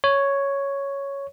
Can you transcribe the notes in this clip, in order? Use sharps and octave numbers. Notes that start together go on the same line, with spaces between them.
C#5